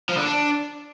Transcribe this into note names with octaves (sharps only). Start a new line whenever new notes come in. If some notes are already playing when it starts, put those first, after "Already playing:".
F3
D3
D4